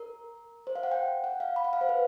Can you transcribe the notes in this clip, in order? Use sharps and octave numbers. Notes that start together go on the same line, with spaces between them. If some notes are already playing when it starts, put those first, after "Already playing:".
Already playing: A#4
C5
F5
F#5
G5
F#5
F5
B5
F#5
F5
C5
B4